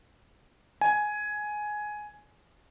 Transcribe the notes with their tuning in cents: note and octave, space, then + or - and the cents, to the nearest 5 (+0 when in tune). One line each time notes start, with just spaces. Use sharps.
G#5 +10